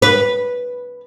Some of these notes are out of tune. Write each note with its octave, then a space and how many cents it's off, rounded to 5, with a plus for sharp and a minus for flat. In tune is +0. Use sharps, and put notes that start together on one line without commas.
B4 -10